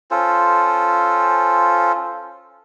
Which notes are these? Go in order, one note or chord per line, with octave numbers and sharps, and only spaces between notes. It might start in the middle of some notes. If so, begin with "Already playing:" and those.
C#4 F4 A4 C5